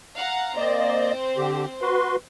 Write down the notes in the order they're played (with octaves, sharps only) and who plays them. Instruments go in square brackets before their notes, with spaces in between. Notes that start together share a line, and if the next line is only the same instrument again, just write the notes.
[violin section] F5 F#5 A#5
[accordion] A#3 D5 D#5 [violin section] C4 C5
[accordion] D3 G4
F#4 B4 C6